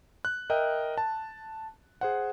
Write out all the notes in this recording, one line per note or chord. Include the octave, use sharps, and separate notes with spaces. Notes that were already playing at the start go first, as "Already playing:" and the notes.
F#6
A#4 D#5 E5 G5
A5
G#4 C5 F#5